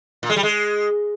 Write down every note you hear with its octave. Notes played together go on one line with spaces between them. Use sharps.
A#2
G#3
G3
G#3